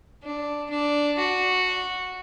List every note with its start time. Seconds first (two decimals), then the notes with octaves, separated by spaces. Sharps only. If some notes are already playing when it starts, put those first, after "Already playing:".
0.24 D4
0.70 D4
1.18 F#4